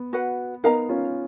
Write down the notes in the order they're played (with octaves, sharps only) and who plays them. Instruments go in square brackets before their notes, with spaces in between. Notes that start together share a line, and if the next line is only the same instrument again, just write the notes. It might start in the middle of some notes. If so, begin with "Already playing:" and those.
Already playing: [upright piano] B3
[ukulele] F#4 B4 F#5
[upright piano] B3 D#4 [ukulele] A#4 F5 A#5
[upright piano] C#4 F4